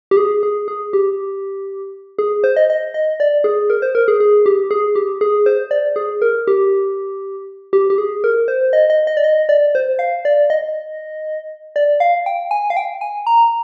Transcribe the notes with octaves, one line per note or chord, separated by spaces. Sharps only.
G4
G#4
G#4
G#4
G4
G#4
C5
D#5
D#5
D#5
D5
G#4
A#4
C5
A#4
G#4
G#4
G4
G#4
G4
G#4
C5
D5
G#4
A#4
G4
G4
G4
G#4
A#4
C5
D#5
D#5
D#5
D5
D#5
D5
C5
F5
D5
D#5
D5
F5
G5
G#5
F5
G5
G#5
A#5